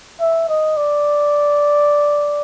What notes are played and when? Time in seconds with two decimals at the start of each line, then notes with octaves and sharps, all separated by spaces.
0.21 E5
0.49 D#5
0.77 D5